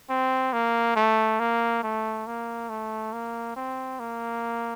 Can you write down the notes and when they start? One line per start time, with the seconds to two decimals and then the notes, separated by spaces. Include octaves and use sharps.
0.10 C4
0.53 A#3
0.96 A3
1.40 A#3
1.83 A3
2.27 A#3
2.69 A3
3.13 A#3
3.56 C4
4.00 A#3